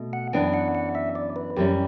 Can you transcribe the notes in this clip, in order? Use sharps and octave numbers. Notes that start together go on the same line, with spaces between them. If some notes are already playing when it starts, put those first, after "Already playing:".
Already playing: B2 A3
F#5
F#2 E3 B3 D4 G5
F#5
F#5
E5
D5
B4
F#2 E3 G3 C#4 G4